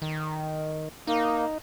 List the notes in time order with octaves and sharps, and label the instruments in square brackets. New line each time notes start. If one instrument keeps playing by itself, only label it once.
[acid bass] D#3
[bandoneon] A#3 [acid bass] D#4